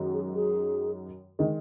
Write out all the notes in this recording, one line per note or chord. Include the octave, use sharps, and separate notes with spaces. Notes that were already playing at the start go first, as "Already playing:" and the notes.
Already playing: F#2 D#3 G#3 F#4
G#4
G#4
D#3 G#3